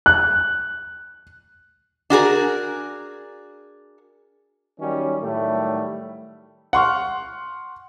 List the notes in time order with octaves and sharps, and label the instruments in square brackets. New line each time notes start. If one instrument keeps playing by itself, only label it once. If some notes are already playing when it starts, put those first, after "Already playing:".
[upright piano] F#6
[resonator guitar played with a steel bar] D4 F#4 G#4 A#4
[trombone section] D#3 F#3 G3 C#4
A2 D#3 F#3 G3 A3
[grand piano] F#5 C6 C#6 F6